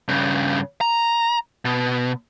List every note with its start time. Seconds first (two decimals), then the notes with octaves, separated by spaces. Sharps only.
0.09 G2 C#3
0.81 A#5
1.65 B2